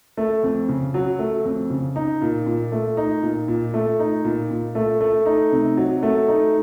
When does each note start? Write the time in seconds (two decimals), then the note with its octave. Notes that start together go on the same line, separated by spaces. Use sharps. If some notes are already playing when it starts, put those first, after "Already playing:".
0.17 A3
0.43 F2
0.69 C#3
0.94 F#3
1.19 A3
1.45 F2
1.70 C#3
1.96 D#4
2.21 A#2
2.47 A#2
2.72 A3
2.97 D#4
3.22 A#2
3.48 A#2
3.74 A3
3.99 D#4
4.25 A#2
4.51 A#2
4.75 A3
5.01 A3
5.26 D#4
5.52 C3
5.77 F#3
6.03 A3
6.28 D#4